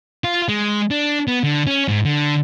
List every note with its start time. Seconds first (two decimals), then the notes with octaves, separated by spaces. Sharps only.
0.24 F4
0.49 G#3
0.91 D4
1.28 B3
1.44 D3
1.67 C#4
1.88 G#2
2.05 D3